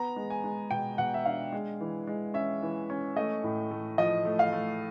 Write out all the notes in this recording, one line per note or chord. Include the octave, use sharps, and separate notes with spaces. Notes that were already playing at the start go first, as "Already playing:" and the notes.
Already playing: B3 A#5
G#3
G#5
G#3
B2 G5
B2 F#5
E5
D4 F5
G#3
E3
G#3
C#4 E5
E3
C#4
A3 D#5
A2
A3
F3 D#5
A3
F5
A3